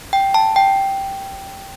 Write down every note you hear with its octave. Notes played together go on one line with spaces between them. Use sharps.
G5
A5
G5